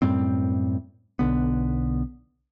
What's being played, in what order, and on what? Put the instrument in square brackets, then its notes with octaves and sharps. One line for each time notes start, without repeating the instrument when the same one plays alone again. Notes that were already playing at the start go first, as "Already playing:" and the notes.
[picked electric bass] F#2 A2 G3 C4
B1 D3 B3